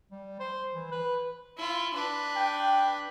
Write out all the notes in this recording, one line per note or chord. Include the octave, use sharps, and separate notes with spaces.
G3
C5
E3
B4
E4 F4
D4 B4
G5